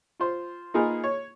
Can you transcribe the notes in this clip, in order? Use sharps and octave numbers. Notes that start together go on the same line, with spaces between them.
F4 C5
A#3 D#4 F4 G#4 A#4 B4
C#5